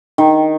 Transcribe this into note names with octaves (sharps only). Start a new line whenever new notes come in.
D#3